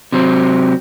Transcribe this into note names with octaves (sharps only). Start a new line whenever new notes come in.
C3 F#3 C4